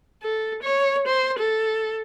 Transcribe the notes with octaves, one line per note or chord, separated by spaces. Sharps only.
A4
C#5
C5
A4